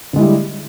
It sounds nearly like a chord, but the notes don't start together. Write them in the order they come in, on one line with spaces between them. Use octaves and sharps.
D3 G#3 E4 G3